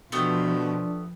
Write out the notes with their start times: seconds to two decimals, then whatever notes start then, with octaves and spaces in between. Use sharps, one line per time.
0.12 B2 F3 A3 B3 D4 G4